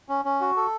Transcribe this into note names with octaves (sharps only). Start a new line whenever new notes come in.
C#4
C#4
F#4
A4